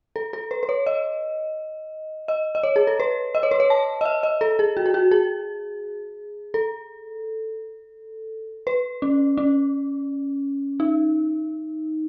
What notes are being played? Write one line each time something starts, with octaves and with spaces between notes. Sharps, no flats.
A4
A4
B4
B4
C#5
D#5
D#5
D#5
C#5
G#4
A4
B4
D#5
C#5
B4
C#5
A5
D#5
E5
D#5
A4
G#4
F#4
G#4
F#4
G#4
A4
B4
C#4
C#4
D#4